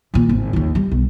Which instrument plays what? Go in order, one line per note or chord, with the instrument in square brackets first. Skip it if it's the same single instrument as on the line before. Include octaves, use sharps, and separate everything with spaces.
[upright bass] D#2 A#2
G#1
D#2 F4
G3
B1